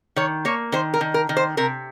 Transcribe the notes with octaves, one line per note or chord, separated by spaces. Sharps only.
D#3 C#5
A#3 C#5
D#3 C5
A#4
D#3
A#4
D#3
C5
C3 A#4